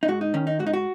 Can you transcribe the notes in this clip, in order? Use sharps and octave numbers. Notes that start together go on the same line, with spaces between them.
D#4
G#2 F#4
D#4
D#3 C#4
D#4
G#2 F#4
D#4
F#4